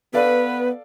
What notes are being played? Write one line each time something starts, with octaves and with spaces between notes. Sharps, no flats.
B3 A4 B4 D5 F5